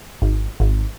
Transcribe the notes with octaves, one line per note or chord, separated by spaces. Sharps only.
G#1
G#1